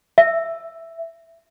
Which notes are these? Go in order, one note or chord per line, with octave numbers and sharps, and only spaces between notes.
E5